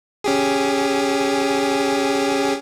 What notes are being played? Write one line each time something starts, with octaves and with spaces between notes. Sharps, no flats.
C#4 G4 G#4